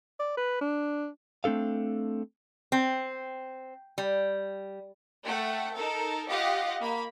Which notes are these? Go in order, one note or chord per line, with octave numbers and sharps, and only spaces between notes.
D5
B4
D4
A3 C4 D4 A4 F5
C4
G3
A3 F#5 G5
D#4 A4 A#4
F4 G4 D#5 F5 F#5
A#3 B5